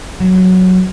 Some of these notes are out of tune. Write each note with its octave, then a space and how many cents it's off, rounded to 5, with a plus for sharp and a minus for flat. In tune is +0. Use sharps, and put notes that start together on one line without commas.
F#3 +0